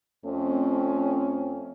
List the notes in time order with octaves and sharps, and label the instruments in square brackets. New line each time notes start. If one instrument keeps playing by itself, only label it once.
[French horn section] F2 A3 C4 C#4